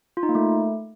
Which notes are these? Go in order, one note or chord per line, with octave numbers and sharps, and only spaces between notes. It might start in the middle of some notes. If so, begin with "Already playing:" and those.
F4
D#4
A#3
A3